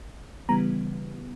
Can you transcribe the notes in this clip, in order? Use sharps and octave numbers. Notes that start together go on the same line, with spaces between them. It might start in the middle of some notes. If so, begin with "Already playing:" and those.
Already playing: G#1
C#3 E3 G3 B3 A#5